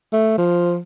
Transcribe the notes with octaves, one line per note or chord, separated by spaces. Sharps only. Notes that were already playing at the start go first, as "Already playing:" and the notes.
A3
F3